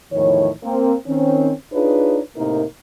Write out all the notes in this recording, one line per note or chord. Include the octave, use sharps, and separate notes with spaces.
E2 A2 D#3 F3 C#5
A#3 C4
D#3 C4 C#4
D4 D#4 F4 G#4 B4 C#5
A2 C3 A#3 D#4 A#4